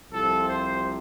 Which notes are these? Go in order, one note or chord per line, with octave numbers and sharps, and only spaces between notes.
C2 C3 F3 A4
C5